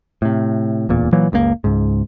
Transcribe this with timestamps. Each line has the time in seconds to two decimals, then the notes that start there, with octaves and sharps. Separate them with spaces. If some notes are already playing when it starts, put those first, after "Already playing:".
0.22 A2 C3
0.89 D1 E2 A#2
1.12 A#2 E3 F#3 A#3
1.32 F#1 C#2 C3 A#3
1.64 C#2 G#2